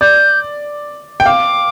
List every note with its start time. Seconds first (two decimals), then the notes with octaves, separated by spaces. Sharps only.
0.01 D5 G6
1.20 G5
1.26 F5 D6